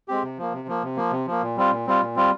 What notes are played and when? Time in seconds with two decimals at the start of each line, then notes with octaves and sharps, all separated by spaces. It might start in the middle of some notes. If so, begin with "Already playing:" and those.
0.08 G#3 C4 G4
0.23 C3
0.38 F3 A#3
0.53 C3
0.68 F3 A#3
0.83 C3
0.97 F3 A#3
1.12 C3
1.27 F3 A#3
1.42 A#2
1.57 G3 C4 F4
1.72 A#2
1.87 G3 C4 F4
2.01 A#2
2.16 G3 C4 F4